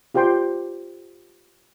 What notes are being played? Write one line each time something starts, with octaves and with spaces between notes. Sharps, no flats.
F4 G4 C5 G5 C6